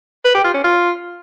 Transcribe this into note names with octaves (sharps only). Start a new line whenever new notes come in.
B4
G4
F4
C#4
F4